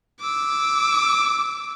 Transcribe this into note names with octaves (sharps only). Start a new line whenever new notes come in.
D6 E6